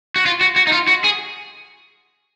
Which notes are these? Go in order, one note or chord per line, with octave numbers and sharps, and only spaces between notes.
F#4
F4
F#4
F#4
D#4
F4
F#4
G#4